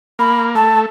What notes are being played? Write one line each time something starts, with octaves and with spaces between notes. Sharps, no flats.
A#3 B5
A3 A5